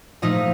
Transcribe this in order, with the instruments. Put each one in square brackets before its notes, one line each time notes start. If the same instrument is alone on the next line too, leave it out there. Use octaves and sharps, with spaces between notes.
[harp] A#2 F3 A3 D#4 D#5